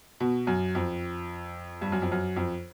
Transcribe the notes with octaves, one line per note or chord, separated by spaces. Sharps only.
B2
F#2
F2
G2
F#2
F2
F#2
F2